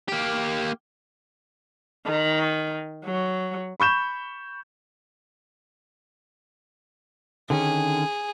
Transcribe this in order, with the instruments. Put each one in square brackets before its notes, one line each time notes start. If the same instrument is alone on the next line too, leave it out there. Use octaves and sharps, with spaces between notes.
[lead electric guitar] A#3 G4
[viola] D#3
F#3
[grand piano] B5 C#6 G6 E7
[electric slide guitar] D3 D#3 C#4 [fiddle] G#4